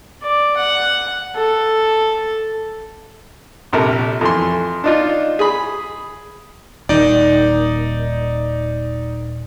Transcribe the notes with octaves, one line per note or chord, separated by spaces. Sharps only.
D5
F#5
A4
A#1 C3 A4 A#4
F2 E3 C6
D4 D#4 F4
G#4 B5
D#1 D#3 D#4 D5